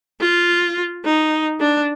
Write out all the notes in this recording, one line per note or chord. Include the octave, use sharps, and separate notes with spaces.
F4
D#4
D4